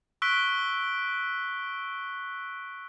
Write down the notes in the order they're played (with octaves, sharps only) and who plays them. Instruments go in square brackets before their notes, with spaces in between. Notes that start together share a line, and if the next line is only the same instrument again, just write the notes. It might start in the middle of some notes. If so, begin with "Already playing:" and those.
[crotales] C#6 E6 F#6 B6 D7 G7